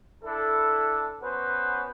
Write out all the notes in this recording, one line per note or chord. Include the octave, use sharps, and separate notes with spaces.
D4 E4 A4
B3 C#4 F#4 B4 C5